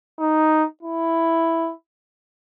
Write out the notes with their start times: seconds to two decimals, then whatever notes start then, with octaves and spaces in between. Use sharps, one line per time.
0.19 D#4
0.83 E4